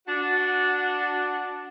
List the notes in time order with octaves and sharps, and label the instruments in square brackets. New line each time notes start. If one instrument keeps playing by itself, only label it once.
[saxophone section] D4 F#4